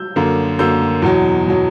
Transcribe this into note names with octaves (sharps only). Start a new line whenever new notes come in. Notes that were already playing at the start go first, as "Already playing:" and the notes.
Already playing: E6 G6
F#2 D3 A#3
F#2 D3 A#3 E6 G6
E2 B2 F#3
B2 F#3